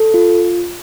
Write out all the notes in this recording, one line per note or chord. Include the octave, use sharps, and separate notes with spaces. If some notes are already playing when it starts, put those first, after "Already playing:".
Already playing: A4
F4